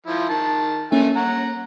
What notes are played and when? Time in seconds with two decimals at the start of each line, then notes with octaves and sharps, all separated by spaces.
0.07 F3 E4
0.29 D#3 A5
0.92 A3 A#3 C#4 E5 G#5
1.16 F#5 A#5